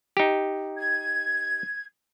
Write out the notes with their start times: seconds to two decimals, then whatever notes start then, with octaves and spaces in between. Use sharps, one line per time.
0.17 D#4 G4
0.78 G#6